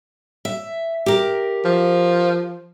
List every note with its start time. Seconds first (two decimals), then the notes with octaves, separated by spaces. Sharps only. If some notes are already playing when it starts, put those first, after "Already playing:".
0.45 E5
1.06 G4 A#4
1.65 F3